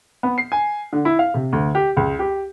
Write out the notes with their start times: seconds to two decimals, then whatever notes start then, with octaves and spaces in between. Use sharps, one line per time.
0.23 B3
0.38 C7
0.52 G#5
0.93 D3
1.05 E4
1.19 F5
1.34 C3
1.53 D2
1.75 G4
1.97 C#2
2.19 G4